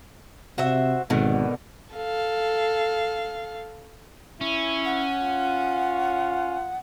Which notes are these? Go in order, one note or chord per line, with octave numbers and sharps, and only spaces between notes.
C3 F#4 C5 E5
G#1 B2 D3 D#3
A4 F5
C#4 E4
F#5
F4